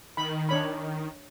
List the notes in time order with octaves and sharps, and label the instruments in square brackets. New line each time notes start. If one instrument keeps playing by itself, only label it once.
[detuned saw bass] D#3 [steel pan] B5
[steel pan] D4 C#5 B5